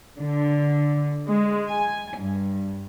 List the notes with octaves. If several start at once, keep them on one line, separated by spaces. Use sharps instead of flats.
D3
G#3
G#5
G2